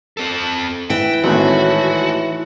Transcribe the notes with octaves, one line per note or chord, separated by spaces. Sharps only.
C4 A4
E3 G5
G#1 A2 F#4